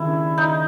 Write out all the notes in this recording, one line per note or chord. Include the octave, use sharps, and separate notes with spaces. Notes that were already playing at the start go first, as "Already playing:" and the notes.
Already playing: D#2 C#3 A#3 D4 E4
D#4